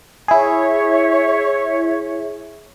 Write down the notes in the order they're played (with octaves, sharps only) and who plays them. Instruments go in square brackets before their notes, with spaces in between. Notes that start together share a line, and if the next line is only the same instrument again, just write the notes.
[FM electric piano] E4 G#4 [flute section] C#5 E5